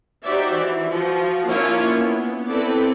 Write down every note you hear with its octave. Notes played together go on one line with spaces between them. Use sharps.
D#4 F#4 G4 C5 D5 E5
E3
F3 F#4
A#3 C#4 D4 E4 F4 C#5
B3
C4 E4 A4 B4 D5